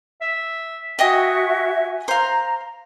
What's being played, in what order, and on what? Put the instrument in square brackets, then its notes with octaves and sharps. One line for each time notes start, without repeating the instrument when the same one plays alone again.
[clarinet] E5
[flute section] F#4 E5 [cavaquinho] D#5 G5 D#6 [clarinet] G#5
[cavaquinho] C5 F5 [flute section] A#5